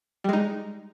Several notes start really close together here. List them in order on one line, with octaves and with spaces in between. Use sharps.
G3 G#3 D#4